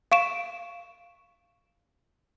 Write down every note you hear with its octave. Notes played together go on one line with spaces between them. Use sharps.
F5 C#6 D7 E7